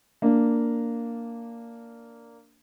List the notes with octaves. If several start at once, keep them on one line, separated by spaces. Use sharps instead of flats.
A#3 D4